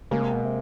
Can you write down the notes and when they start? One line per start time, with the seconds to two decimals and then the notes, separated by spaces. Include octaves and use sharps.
0.11 C#3 G#3 A#3
0.22 C3
0.33 B2
0.45 C3